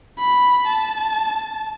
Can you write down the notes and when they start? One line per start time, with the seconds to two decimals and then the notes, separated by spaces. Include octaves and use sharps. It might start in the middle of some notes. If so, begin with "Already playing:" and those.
0.19 B5
0.67 A5